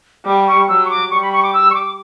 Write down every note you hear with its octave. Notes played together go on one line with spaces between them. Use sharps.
G3 D6
C#6
F#3 E6
C#6
D6
G3 C#6
B5
C#6
D6
E6
C#6
D6